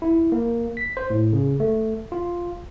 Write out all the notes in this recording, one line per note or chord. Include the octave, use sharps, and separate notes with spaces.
E4
A#3
B6
C5
A2
C#3
A3
F4